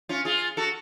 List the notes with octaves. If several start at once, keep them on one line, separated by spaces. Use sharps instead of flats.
C#4 F4
F4 G#4
F#4 A4